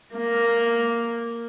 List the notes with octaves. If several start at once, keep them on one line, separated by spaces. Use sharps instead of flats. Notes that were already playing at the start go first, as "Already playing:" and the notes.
A#3